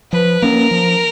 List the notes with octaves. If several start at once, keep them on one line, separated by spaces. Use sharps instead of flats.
F3 B4
A#3 C#4 A#4
F3